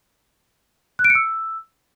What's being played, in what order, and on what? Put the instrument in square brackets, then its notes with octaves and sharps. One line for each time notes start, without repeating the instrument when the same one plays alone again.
[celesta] F#6
D7
C#7
E6